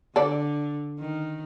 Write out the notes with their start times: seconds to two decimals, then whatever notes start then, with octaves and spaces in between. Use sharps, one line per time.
0.16 D3 A4 D5
0.99 D#3